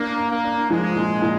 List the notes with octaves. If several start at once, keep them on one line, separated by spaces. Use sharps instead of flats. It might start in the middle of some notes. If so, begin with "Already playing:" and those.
Already playing: A#3 D4
D4
A#3
D4
F3 G#3
A#2
A#2